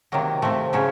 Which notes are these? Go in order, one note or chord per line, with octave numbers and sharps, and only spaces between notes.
C3 D#3 F#3 A#3
C3 F3 A3
C#3 F#3 A3 C#4 E4